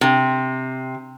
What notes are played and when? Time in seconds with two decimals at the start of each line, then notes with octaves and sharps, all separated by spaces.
0.01 C3